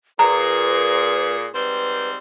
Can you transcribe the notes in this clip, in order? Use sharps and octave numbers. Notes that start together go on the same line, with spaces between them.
A#2 G#4 B4 A#5
G#2 G3 C4 B4